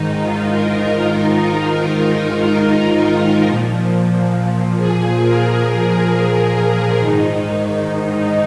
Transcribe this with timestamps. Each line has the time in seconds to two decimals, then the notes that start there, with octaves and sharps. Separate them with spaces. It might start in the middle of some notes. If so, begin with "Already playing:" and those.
Already playing: G#2 D#3 D#4
0.20 F4
0.49 A#4
0.79 D#4
1.68 F4
3.45 A#2 F3
4.78 G#4
5.22 A#4
6.99 G#2 D#3 D#4